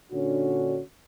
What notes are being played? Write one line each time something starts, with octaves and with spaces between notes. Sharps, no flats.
A#2 D3 C#4 D4 F#4